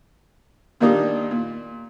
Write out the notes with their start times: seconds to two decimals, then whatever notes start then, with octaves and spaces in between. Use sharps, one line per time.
0.80 A#2 D#3 G3 A#3 D4 D#4
1.31 A#2